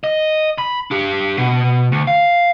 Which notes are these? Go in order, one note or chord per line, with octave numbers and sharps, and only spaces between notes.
D#5
B5
D4 G4
B2
D2
F5